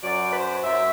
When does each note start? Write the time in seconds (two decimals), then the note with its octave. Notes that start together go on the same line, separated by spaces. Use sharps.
0.03 F#2 F#3 D5
0.28 B4
0.35 C5
0.64 F#2 F#3 E5